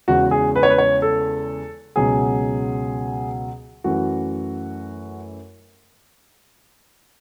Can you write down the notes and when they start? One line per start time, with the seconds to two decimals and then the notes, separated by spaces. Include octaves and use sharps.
0.08 E2 C#3 E3 G#3 F#4
0.31 G#4
0.56 B4
0.63 C#5
0.70 B4
0.78 C#5
1.02 A4
1.96 C#2 B2 F#3 G#4
3.84 F#2 E3 A3 F#4